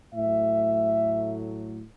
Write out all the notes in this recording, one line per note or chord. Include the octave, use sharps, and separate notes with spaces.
A2 F#3 A3 E5